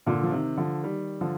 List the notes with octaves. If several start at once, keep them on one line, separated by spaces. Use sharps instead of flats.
A#2 D3
F3
C3 D#3
D3 F3
D#3 G3
D3 F3